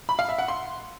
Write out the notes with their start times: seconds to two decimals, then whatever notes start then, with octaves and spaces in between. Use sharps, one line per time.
0.09 B5
0.19 F5
0.29 E5
0.38 F#5
0.48 C6